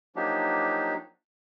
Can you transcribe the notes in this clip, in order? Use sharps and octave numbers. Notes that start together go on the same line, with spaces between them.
F3 F#3 A#3 D4 D#4 G4